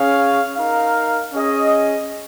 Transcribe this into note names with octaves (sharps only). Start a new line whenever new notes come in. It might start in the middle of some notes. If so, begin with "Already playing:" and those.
Already playing: C#4 G#4 C#5 F5
D#4 A#4 F5
C#4 G#4 D#5